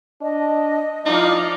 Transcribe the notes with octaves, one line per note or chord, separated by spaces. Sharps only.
D4 D#5
F3 D#4 E4 D5 F5